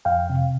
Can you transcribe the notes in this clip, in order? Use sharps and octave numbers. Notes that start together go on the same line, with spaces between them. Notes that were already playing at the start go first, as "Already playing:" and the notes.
F2 F5 G5
C3